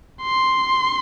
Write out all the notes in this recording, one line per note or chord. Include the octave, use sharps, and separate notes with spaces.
C6